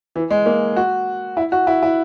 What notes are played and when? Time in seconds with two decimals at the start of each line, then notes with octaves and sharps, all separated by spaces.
0.16 E3
0.30 G#3
0.46 A#3
0.76 F#4
1.37 E4
1.52 F#4
1.67 E4
1.83 E4